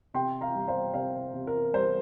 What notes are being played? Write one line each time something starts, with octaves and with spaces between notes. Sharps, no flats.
C3 G5 C6
F5 A#5
G3
C5 F5
C3 C5 F5
C3
A#4
G3 C5